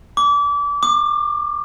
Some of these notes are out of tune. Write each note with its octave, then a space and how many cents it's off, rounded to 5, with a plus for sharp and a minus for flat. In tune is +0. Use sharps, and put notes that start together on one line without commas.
D6 -30
D6 +30